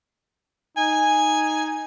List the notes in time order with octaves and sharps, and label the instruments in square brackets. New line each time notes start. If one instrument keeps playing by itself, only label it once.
[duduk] D#4 [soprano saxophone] G#5